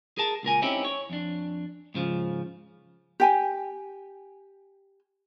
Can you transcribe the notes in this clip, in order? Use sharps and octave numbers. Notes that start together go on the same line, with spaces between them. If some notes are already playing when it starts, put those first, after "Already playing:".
G#4 A#4 A5
C#2 A#2 A#4 G#5
C4 C#4 D#4 E4 G4
C#5
F2 D4
G#2 C#3 F3
G4 G5 G#5